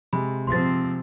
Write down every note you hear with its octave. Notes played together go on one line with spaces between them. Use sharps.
C3 G#3 B5
F3 C4 C6 A6